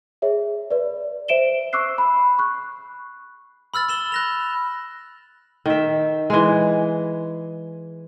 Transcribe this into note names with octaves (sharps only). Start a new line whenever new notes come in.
G#4 C#5 E5
B4 D5
C5 E5 D7 E7 G7
C#6 D6 E6 F#6 C7
B5
C#6 F#6
B5 E6 F6 A6
B5 E7 G7
F#6 A#6 F7
D#3 E5
E3 G#3